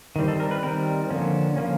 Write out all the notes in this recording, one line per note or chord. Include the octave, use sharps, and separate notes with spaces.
D#3 G3 C4
A4
A#4
B4
D#3 G3 C4 A#4
D3 F3 A#3 C#4
D3 F3 A#3 C#4